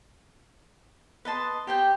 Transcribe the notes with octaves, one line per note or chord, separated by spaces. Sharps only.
B4 D#5 A5 C6
G4 C5 G5